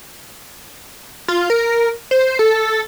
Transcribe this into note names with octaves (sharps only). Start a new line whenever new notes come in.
F4
A#4
C5
A4